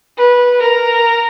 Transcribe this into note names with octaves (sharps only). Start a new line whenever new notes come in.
B4
A#4